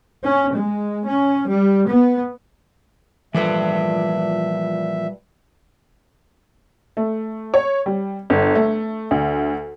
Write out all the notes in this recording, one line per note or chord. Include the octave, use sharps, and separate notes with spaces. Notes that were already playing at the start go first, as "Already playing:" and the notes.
C#4
G#3
C#4
G3
B3
A#2 E3 F3 G3 A3 B4 E5
A3
C#5
G3
G1
A3
D2